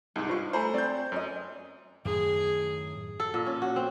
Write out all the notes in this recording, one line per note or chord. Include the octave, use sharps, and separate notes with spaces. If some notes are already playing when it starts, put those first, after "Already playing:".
C2 G#2 D#4
G2 F4 C5 C#6
A3 C5 G#5 A#5 B5
C4 D5 G6
F#2 C#4 D#5
F#2 A2 D#3 G#4
A4
A#2
C#4
F#4
C4